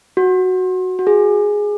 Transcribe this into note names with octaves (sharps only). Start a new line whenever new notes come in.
F#4
F#4
G#4